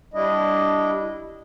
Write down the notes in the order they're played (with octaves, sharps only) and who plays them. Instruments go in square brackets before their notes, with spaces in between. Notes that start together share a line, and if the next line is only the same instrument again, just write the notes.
[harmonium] G3 D4 E4 D#5